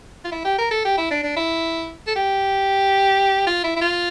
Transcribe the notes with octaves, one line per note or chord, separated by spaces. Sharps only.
F4
E4
G4
A#4
A4
G4
E4
D4
D4
E4
A4
G4
F4
E4
E4
F4